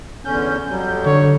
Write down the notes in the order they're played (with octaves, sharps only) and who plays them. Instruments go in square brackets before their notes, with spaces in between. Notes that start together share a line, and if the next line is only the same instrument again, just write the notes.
[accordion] E2 D3 C#4 [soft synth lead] G6
[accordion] F2 F#3 G3
[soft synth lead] D3 [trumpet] C#5